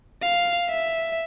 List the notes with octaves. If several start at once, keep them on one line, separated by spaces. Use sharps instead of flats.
F5
E5